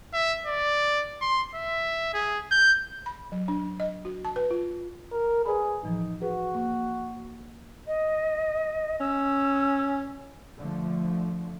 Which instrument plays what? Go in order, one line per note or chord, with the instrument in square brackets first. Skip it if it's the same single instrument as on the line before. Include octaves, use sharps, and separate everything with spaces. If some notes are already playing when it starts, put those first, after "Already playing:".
[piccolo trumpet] E5
D5
C6
E5
G#4
G6
[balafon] B5
F#3
D4
D#5
F#4
A5
B4
F4
[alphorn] A#4
[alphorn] G#4 [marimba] B4 D5 B5
[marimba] A2 E3 F3 [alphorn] D#4
[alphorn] F#4 [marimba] G#4 B4
[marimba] A#3 C#6
[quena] D#5
[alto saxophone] C#4 [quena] E6
[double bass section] D3 F3 A3